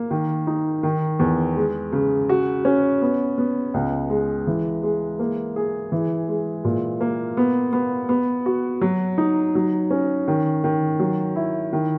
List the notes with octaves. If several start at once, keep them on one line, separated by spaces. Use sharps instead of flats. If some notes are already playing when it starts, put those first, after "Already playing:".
Already playing: A#3
D#3
D#4
D#3
E2
G#3
C#3
F#4
C#4
B3
B3
C#2
G#3
E3
G#3
A#3
G#4
E3
G#3
A#2
A#3
B3
B3
B3
F#4
F#3
D#4
F#3
C#4
D#3
D#3
F#3
E4
D#3